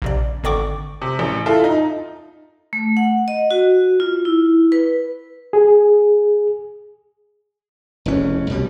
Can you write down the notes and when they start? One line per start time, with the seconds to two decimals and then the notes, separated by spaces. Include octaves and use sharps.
0.02 A#1 C3 D5
0.44 G#1 D3 D5 G5 C#6 D6
1.02 C3
1.19 A1
1.46 E4 F4 A4
1.64 D#4
2.73 A3
2.97 F#5
3.28 D#5
3.51 F#4
4.00 F4
4.25 E4
4.72 B4
5.53 G#4
8.06 F1 E2 C#4
8.50 C2 B2 G3